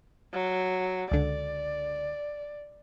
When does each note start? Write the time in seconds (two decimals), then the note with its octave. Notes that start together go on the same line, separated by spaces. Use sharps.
0.33 F#3
1.11 C#2 D3 D5